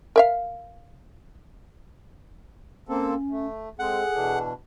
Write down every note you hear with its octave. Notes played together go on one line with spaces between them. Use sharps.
A#4 E5 F5
A#3 C4 C#4 A4
A3
G#3 C4 G#4 A4 F#5
B2 E3 D4